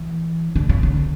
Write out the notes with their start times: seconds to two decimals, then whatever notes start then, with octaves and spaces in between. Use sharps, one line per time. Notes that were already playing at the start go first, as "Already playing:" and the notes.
Already playing: E3
0.56 D3
0.69 C#3
0.83 D3